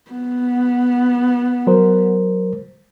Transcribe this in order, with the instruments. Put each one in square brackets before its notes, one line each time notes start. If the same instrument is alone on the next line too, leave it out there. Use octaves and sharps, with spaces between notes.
[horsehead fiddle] B3
[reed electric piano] F#3 A#4 C5